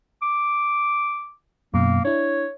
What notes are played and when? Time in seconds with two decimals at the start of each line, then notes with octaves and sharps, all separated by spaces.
0.22 D6
1.74 F#2 B2 A#3
2.05 D4 E4 C#5